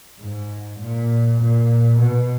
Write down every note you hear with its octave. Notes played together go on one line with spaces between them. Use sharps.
G#2
A#2
A#2
B2